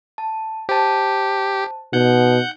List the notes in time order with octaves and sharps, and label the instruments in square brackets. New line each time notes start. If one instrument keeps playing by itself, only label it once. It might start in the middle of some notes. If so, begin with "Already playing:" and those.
[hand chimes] A5
[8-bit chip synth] G4 [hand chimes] C5 A5
[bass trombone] B2 [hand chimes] D#4 [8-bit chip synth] F#5 G6